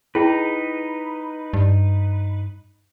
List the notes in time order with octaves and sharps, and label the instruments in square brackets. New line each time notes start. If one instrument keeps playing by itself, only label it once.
[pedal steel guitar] D#4 B4 [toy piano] E4 G#4 G5
[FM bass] G2